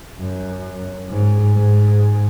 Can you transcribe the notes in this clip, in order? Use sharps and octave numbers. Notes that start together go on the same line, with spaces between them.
F#2
G#2
G#2